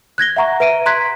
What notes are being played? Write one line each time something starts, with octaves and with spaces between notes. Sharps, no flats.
F#6 G#6 A#6 G7
E5 F#5 A#5 C#6
B4 E5 D7 D#7
A#5 C6 F#6 G#6 B6